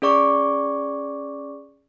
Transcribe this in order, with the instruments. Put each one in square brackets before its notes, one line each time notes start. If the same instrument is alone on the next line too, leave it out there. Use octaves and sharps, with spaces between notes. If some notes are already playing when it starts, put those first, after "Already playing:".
[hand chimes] C#4 G#4 D5 C#6 D6